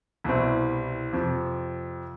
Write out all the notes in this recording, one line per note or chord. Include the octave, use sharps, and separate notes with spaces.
C2 B2 G3 C4 E4
F2 C3 F3